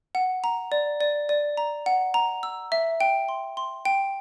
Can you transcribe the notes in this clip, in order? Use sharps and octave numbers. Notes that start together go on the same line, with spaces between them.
F#5
A#5
D5
D5
D5
A#5
F#5
A#5
E6
E5
G5
C6
C6
G5